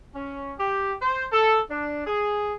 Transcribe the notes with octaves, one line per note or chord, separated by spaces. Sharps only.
C#4
G4
C5
A4
D4
G#4